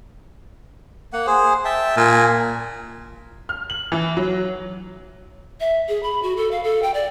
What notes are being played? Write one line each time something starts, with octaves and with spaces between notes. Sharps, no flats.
A#3 F#5
G#4 C5
E5 G5 A5
A#2 G#5
F6
F#7
E3
F#3
E5
G#4
B5
F#4
A4
F5
A4
G5
D5